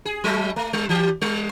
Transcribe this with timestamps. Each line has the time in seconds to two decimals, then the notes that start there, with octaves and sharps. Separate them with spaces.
0.05 G#4
0.24 F#3 G#3 A3
0.56 A3
0.73 G3
0.89 E3 G4
1.22 G3